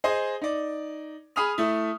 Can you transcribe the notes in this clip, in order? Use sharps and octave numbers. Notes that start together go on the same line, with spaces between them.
G#4 C5 D#5
D#4 D5
G#4 B5 D#6 F6 F7
A3 E4